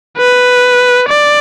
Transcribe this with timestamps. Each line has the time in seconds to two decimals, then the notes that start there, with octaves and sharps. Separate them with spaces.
0.18 B4
1.09 D5